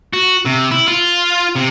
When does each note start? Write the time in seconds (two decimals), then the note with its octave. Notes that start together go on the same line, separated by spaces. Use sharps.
0.13 F#4
0.45 C3
0.71 E4
0.88 F4
1.56 C3